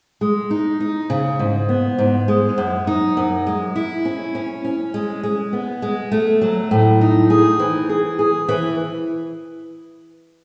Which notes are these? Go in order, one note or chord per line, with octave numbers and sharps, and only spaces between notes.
G#3
D#4
D#4
C#3
G#2
B3
G#2
G#3
F#2
D#4
F#2
G#3
E4
C#4
C#4
C#4
G#3
G#3
B3
G#3
A3
F#3
A2
D#4
G#4
E3
G#4
G#4
E3